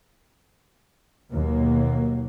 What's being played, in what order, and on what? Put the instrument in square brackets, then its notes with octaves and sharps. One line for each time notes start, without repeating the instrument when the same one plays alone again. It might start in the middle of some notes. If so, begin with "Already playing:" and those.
[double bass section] D#2 B2 F#3 A#3